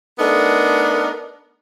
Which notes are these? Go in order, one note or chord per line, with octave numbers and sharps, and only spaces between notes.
A3 B3 D4 D#4 A#4